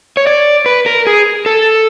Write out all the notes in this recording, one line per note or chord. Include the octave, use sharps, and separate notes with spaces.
C#5
D5
B4
A#4
G#4
A4